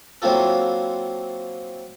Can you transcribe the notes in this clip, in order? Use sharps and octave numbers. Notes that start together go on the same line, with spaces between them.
F#3 A#3 C4 E4 F4 A4